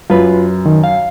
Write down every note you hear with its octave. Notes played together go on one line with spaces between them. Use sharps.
F#2 F4 B4
D#3
F5